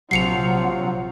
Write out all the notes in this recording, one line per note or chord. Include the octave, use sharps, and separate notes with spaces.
A#1 C3 F3 F#3 F#5 C7 C#7 F7